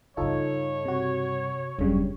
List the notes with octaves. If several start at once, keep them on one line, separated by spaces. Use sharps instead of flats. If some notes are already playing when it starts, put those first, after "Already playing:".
G2 C#3 D#4 F4 A4 C#5
C3 F#4
E1 G2 C#3 F#3 G3